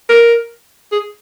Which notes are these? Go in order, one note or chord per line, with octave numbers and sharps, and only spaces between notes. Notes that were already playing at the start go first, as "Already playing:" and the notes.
A#4
G#4